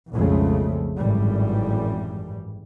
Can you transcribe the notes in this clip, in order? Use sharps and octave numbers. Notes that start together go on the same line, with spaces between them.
B1 F2 C#3 F3 G#3 A3
G#1 F#2 A2 E3 G3